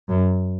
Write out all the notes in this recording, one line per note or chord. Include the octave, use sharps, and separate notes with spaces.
F#2